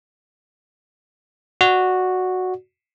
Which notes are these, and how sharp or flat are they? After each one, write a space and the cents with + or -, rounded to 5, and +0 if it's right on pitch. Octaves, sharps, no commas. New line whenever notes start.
F#4 -5 D5 +10